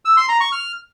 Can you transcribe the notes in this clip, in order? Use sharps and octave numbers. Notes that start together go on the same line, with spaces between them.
E6
C6
A#5
C#6
F6